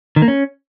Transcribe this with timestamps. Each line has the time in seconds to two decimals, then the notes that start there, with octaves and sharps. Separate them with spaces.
0.16 D#3
0.22 A#3
0.28 C#4